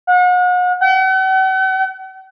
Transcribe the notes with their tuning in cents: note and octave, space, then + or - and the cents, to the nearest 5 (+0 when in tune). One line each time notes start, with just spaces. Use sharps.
F#5 -40
F#5 +45